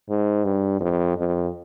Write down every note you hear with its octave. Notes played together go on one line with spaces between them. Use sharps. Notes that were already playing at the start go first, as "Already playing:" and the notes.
G#2
G2
F2
F2